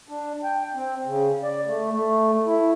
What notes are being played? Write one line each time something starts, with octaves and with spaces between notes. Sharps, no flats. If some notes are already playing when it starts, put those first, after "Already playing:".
D4
G5
C4
C#3
D5
A3
A3
E4